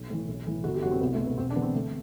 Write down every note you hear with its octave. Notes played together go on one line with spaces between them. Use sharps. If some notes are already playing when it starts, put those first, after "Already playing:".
Already playing: B1
A2 E3
B1
A2 E3
G1 F#4
G4
F#2 E3 F#4
C4
C2 B3
A3
B2
B3
E1 C4
D4
E2 D3 B3
C4
G1 A3